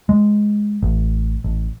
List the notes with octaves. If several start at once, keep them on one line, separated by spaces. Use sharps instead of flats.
G#3
A1
A1